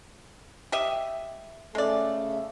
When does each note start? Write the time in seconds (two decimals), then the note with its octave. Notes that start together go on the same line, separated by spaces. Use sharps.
0.72 G4 D#5 E5
1.75 C#3 G#3 A3 A4 D5